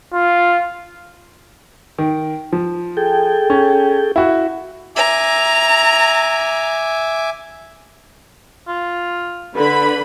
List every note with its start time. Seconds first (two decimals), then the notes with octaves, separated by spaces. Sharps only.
0.13 F4
1.99 D#3
2.52 F3
2.97 G#4 A4 G5
3.50 C#4
4.16 E4 F#4
4.96 E5 G#5 A#5 D6
8.68 F4
9.55 D3 B4 B5